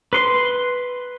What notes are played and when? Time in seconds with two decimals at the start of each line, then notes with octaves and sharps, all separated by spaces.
0.13 B4 C6